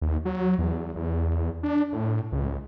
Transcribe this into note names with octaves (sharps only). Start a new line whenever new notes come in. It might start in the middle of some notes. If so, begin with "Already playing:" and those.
D#2
F#3
E2
E2
D4
A2
C#2